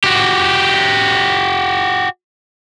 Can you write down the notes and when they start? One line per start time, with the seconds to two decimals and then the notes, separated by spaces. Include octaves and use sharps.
0.04 F#4 G4